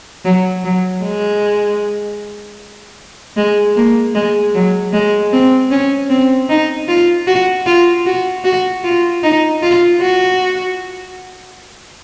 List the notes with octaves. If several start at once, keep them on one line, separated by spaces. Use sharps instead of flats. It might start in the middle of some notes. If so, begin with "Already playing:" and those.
F#3
F#3
G#3
G#3
A#3
G#3
F#3
G#3
C4
C#4
C4
D#4
F4
F#4
F4
F#4
F#4
F4
D#4
F4
F#4